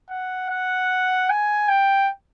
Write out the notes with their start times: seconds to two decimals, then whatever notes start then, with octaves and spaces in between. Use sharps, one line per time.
0.10 F#5
0.50 F#5
1.30 G#5
1.68 G5